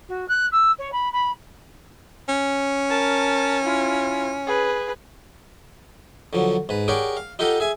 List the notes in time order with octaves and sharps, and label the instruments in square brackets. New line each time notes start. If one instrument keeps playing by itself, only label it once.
[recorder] F#4
F#6
E6
C#5
B5
B5
[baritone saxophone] C#4
[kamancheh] A#4 A5
E4 F4
G#4 B4
[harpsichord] D3 F3 F#3
G#2 B4
G4 G#4 A#4 C#5 D5 F#5
F5
D#4 F4 G4 A4 D#5 F#5
G#4 E5 G#5